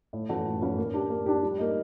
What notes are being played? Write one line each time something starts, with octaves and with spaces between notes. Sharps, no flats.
A2
E3 A3 C#4 F#4
A2
E3 A3 C#4 F#4
A#3
D4 G4
A#3
D4 G4
G3
A#3 D#4